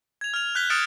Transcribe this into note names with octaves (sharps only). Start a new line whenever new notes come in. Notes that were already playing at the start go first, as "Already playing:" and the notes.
G#6 F7
F6 F7
F#6 G6 B6 G7
D#6 F6 A6 C#7 D7 E7